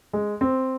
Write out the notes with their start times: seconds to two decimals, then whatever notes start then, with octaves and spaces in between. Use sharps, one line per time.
0.13 G#3
0.41 C4